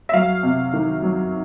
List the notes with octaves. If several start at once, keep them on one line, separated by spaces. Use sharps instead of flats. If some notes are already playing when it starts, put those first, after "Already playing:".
E5
F#3 F5
C3
D#3
F#3